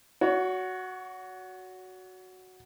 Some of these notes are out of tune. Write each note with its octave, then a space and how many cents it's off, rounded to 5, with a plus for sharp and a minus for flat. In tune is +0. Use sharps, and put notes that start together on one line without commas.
F#4 +0 C#5 +35